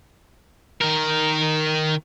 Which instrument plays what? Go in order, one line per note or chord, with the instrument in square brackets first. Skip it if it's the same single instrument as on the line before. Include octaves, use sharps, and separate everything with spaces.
[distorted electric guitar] D#3 A#4